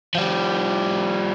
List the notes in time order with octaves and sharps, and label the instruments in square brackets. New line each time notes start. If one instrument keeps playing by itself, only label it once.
[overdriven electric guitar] F3 G3